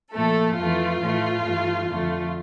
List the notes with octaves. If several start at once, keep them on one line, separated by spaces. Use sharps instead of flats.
A#2 F3 A3 A4
F2 E3 A3 F4
A2 E3 A3
G2 E3 A3
F2 D3 A3